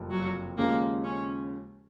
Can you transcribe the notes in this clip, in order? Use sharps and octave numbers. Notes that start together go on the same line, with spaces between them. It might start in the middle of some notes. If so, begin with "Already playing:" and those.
Already playing: F#1 F2 C3 F3
F#3
D#2 C#3 F3 G#3 A#3
C#4